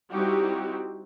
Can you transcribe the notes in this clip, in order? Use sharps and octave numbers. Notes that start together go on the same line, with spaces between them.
G3 C4 D#4 E4 F#4 G4